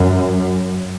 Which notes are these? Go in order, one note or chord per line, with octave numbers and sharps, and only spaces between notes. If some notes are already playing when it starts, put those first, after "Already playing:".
Already playing: F#2